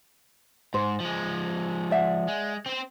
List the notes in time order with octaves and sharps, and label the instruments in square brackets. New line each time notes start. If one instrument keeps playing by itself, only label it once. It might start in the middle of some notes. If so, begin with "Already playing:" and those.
[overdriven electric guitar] G#2 [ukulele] C5
[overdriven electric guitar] F3 G#3
[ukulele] D5 E5 F#5
[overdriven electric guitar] G#3
C4 C5